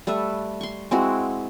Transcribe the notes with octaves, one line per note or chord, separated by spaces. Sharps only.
G3 A3 B4 E5
C6 C#6
G#3 C4 E4 F#4